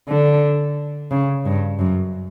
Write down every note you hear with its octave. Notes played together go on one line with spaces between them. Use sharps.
D3
C#3
G2
F#2